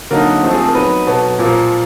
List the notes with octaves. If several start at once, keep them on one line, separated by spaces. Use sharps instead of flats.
D3 F#3 A#3 D#4 A#4
F3 A3 C4
G#4
A4
A#4
F#3 B3 D#4 B4
B2 F#3 B3 A4
A#2 F3 A#3